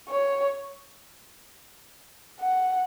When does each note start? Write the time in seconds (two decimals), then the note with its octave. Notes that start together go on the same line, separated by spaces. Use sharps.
0.08 C#5
2.40 F#5